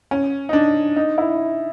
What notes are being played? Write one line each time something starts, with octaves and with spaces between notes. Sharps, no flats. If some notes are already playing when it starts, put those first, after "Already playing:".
C#4
D#4
D4
D#4
E4